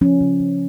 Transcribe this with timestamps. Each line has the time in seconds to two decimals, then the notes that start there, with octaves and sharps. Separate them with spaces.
0.01 F3 C#4
0.21 C#3
0.40 C#3